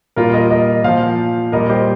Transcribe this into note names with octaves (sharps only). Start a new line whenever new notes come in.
A#2 G3 F4 A#4
A#4 D#5
A#4 D#5
A#2 F3 C5 F5
A#2 G3 A#4 D#5
G4 C5